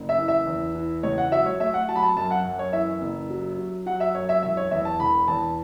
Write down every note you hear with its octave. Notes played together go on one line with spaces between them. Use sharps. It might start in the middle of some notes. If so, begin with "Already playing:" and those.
Already playing: F#1
E5
E3
E5
E2
E3
C#2 C#5
F#5
F#3 E5
C#5
A3 E5
F#5
F#3 A5
B5
A5
F#2 A5
F#5
F#2
C#5
E3 E5
F#1
F#3
F#3
F#3 F#5
E5
F#2 C#5
E5
E1 E5
C#5
E2 E5
A5
E1 B5
E2 A5